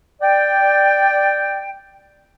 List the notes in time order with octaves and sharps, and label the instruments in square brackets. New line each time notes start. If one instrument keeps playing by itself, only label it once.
[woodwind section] D5 G5